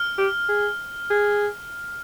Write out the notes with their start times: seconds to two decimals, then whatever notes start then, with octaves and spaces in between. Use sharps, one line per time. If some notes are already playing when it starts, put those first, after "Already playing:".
Already playing: F6
0.18 G4
0.49 G#4
1.10 G#4